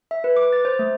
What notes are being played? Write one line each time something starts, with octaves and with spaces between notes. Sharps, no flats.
E5
B4
D6
A6
C5
A3